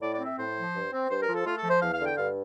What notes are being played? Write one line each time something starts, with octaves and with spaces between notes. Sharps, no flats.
A2 D5
D5
C4
E5
A2 C5
F3
G2
C4
G2 C5
A#4
F3
A4
A3 F4
A4
F3
C5
E2 F5
F5
D3
G5
G2 F5